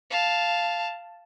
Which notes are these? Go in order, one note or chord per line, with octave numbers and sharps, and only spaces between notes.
F5 A5